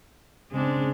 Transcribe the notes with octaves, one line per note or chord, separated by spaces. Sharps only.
C#3 G#3 C4 D4